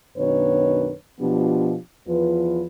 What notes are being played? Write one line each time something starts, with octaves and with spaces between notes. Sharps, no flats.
F#2 B2 D#3 D4 B4 C#5
B2 F3 B3 D4 F4 G4
E2 F3 F4 B4